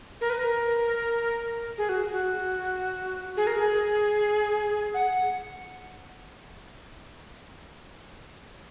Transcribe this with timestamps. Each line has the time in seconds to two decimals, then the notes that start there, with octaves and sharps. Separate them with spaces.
0.21 A#4
0.30 B4
0.39 A#4
1.78 G#4
1.89 F#4
2.12 F#4
3.37 G#4
3.47 A#4
3.58 G#4
4.94 F#5